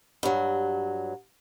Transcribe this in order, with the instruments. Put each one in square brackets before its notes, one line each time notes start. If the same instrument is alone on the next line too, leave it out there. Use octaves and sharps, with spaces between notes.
[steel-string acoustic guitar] G2 F#3